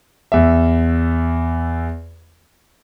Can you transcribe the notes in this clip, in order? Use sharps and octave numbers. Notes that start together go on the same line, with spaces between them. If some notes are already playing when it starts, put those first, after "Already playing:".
E2 E5